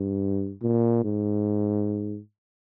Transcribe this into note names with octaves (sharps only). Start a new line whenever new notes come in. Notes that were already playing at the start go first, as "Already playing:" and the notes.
Already playing: G2
A#2
G#2